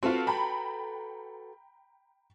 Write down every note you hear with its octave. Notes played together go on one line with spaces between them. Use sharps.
C4 F4 F#4 A4 B4
G5 A#5 B5